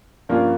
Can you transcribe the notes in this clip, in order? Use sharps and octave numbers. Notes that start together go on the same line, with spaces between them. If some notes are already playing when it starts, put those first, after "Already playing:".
G2 F3 A#3 C#4 F4